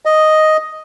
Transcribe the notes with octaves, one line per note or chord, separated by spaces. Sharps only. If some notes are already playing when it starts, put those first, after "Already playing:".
D#5